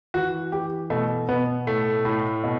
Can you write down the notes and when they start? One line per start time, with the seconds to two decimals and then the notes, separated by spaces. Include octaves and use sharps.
0.14 E3 F#4
0.52 E3 G4
0.90 B2 A3
1.29 B2 B3
1.67 A2 A3
2.05 A2
2.44 B2